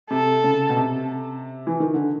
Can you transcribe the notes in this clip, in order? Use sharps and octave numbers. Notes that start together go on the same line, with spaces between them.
C3 A4
C#3
B2
C3
E3
D#3
D3